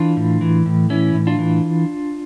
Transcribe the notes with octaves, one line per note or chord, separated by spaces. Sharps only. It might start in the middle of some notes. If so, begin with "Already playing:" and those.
Already playing: E3 D4 F4
A2
E3
A2
E3 C#4 E4
A2
D4 F4
E3